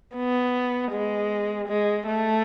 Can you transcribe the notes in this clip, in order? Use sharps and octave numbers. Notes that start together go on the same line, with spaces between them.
B3
G#3
G#3
A3